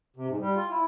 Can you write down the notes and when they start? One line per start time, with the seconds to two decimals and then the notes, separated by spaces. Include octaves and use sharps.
0.16 C3
0.29 G#2
0.40 G3
0.56 F4
0.70 E4